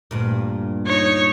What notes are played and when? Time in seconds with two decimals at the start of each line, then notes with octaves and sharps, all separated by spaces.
0.11 D2 G2 A#2
0.87 D#4 C#5